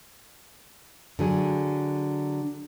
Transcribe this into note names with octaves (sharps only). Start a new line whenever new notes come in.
D3 F#3 G#4